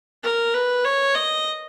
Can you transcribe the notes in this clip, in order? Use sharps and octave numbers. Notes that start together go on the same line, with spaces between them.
A#4
B4
C#5
D#5